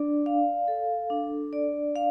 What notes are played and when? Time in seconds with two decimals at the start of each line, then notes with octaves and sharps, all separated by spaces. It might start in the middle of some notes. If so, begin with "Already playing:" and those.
Already playing: D4 D5
0.26 F5
0.68 A4
1.10 D4
1.53 D5
1.96 F5